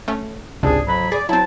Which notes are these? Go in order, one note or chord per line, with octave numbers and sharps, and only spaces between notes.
A3 C#4
G#1 C#2 C3 D4 G#4
F2 F#3 B5
G#4 D5
F#3 C4 E4 A5